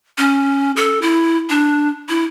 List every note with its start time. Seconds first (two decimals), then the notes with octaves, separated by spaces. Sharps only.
0.18 C#4
0.76 A4
1.02 E4
1.49 D4
2.09 E4